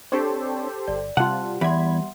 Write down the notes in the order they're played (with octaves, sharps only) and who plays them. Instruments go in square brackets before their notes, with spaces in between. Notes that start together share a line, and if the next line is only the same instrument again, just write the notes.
[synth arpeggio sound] C4 D4 C#5 [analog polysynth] G4 A4 C5
[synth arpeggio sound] G1 [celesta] D5
[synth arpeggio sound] C3 F4 [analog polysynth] G3 [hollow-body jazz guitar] F#5 [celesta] A5 C6
[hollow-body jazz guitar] E2 [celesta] E5 F#5 C6 [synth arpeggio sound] B5 G#6